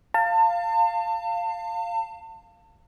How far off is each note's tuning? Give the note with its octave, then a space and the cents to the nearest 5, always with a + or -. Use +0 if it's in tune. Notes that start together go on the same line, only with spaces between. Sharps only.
F5 +0 A5 +35